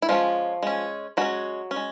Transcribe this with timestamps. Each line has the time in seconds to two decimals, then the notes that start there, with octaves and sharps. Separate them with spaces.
0.02 E4
0.09 F3 G#3 C#4 F4
0.63 G#3 C#4
1.17 F#3 G#3 C#4 F#4
1.71 C#4
1.76 G#3